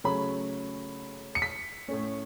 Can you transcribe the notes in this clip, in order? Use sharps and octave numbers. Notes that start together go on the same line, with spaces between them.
C#3 F#3 A3 C#4 B5
C#7
B6
A2 A3 C#4